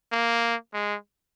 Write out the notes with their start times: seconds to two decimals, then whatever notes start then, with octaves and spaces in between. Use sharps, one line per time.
0.12 A#3
0.74 G#3